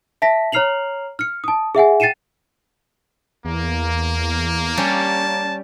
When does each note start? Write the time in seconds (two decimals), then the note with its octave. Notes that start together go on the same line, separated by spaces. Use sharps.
0.22 E5 A5 A#6 B6
0.52 C#5 A#5 F6 C7 F7 F#7
1.19 F6 C#7
1.44 A5 D#6
1.75 G#4 E5 F#5 G#5
2.00 G5 A6 C7 C#7 D#7 E7
3.45 E2 A#3
4.77 G3 C#4 A5